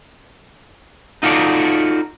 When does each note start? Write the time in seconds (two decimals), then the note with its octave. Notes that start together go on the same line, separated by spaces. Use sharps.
1.23 D#4 F4 F#4 A4 D5